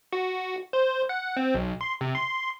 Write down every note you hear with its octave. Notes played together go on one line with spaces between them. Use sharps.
F#4
C5
F#5
C4
B1
C6
C3
C6